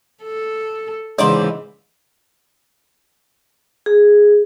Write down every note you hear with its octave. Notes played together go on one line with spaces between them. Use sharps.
A4
G#2 C#3 E3 C5 D5 D6
G#4